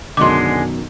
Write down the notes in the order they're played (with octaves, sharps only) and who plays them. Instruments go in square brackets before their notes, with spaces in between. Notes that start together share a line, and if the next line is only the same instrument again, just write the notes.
[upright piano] F#2 B2 D#3 [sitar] D3 G#3 [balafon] C6 D6